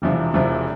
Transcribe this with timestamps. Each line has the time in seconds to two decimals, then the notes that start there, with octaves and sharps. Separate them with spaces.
0.02 E1 E2 C3 F3
0.34 E1 E2 C3 F3